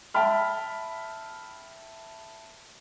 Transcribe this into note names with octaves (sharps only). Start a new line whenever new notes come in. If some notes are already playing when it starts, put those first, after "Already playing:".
E5 G5 A5 B5 F6